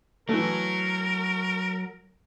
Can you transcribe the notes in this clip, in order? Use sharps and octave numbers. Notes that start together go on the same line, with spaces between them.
E3 F#3 A3 A#4